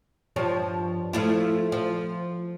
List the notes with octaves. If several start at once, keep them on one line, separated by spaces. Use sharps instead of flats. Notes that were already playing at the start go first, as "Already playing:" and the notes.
G2 F3 C#5
F3 A3 E4
F3